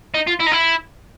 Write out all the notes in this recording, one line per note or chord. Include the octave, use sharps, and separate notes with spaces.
D#4
F4
E4
D#4
E4